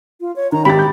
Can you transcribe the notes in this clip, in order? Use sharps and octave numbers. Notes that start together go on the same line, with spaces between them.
F4
C#5
D#3 A#5
G#1 G4 B5 A6
G6